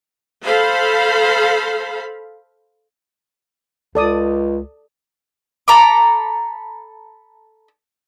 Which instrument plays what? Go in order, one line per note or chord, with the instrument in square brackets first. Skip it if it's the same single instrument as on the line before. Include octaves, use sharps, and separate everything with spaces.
[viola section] A4 C5 F5 B5
[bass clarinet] C#2 [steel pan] A4 D5 D#6
[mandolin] A4 A#5 B5 D6